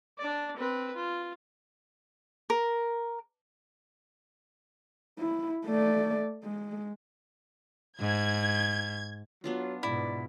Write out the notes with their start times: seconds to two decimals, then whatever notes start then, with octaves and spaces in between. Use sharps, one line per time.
0.18 D4 D5
0.56 C4 B4
0.95 F4
2.50 A#4
5.19 E4
5.66 A3 D5
6.44 G#3
8.00 G#2 G#6
9.44 F#3 B3 D4 F4
9.83 G#2 B2 E4 D5